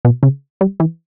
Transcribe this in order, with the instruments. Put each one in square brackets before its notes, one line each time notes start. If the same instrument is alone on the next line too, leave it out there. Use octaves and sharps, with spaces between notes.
[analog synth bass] B2
C#3
G3
E3